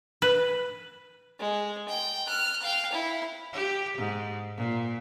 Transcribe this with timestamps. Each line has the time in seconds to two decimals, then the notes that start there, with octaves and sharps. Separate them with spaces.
0.22 B4
1.39 G#3
1.88 G5
2.27 F6 F#6
2.62 F5 G5
2.92 E4
3.53 G4
3.98 G#2
4.57 A#2